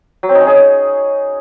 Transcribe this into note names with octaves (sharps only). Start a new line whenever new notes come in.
F#3
C4
D#4
C#4
G#4